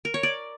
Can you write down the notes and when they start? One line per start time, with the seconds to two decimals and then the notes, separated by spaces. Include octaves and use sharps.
0.05 A#4
0.14 C#5
0.23 D5